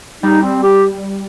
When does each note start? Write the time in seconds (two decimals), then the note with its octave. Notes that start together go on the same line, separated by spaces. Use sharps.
0.22 G3 D#4
0.42 C4
0.62 G4